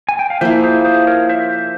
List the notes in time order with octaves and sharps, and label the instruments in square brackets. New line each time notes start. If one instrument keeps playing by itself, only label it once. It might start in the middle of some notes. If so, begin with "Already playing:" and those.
[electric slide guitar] G#5
G5
F5
[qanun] F3 A#3 E4 [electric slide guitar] C5 E5
[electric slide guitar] G#4 C5
G#4 C5
A#4 C#5
C5 E5